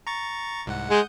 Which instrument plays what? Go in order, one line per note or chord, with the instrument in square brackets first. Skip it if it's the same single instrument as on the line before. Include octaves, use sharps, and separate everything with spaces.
[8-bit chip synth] A#5 C#6 A6
C2 G#2 F#5
[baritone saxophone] G#3 [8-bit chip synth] F#5 D#6 G6